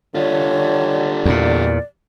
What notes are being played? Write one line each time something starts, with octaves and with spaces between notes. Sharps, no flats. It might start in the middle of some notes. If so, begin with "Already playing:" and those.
D3 G3 F4 C#5
E2 A#2 D5